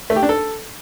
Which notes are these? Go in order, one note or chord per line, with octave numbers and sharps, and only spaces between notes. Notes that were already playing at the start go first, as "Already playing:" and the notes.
A3
G4
D4
A4